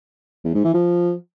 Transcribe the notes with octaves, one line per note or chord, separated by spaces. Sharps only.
E2
G#2
E3
F3